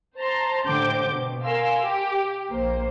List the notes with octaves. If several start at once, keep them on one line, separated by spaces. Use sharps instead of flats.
C5 A5 A#5 C6
A2 D3 G4 C5 D6 G6
B2
A#4 F5 G#5 C6 E6
G4
A#1 A#3 C5